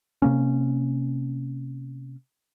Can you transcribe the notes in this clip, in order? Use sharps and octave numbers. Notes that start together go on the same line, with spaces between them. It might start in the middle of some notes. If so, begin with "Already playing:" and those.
C3 A#3 C#4